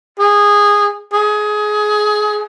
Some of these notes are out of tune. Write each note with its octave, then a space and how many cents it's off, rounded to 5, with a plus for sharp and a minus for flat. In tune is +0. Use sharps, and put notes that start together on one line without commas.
G#4 -15
G#4 +20